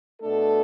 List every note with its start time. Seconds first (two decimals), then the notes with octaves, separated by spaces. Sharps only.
0.22 B2 A3 D4 A4